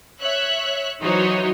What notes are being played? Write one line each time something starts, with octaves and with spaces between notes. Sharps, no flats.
C#5 E5 F#6
E3 F#3 D#4 F#4 C5 C#5